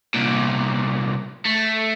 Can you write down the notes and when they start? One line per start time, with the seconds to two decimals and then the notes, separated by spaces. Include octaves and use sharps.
0.14 C2 A#2
1.45 A3